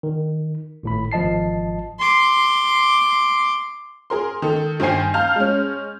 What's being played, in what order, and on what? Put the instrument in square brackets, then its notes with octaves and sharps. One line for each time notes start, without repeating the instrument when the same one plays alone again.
[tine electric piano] D#3
G#1 A2 B5
G#1 F3 D#5 A5 C7
[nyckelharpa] C6 D6
[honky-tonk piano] G#4 A#4 C6
D#3 A4
G2 D#3 C5 G5 G#5 C7
F5 A5 A#5 F6 G6
G#3 C#4